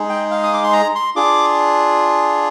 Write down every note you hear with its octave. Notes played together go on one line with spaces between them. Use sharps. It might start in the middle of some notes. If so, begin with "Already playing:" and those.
Already playing: G#3 D#4 G#4
G5
F5
D#6
D6
C6
A#5
C6
D4 F4 G#4 D6